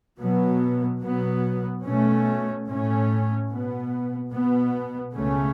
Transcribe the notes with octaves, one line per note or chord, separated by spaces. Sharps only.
B2 F#3 B3
B2 F#3 B3
B2 A3 C#4
A2 A3 C#4
B2 B3
B2 B3
C#2 C#3 A3 C#4